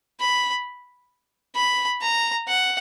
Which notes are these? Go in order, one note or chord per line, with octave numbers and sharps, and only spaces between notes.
B5
B5
A#5
F#5